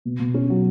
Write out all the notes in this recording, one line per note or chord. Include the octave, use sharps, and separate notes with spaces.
B2
B2
C#4
F#3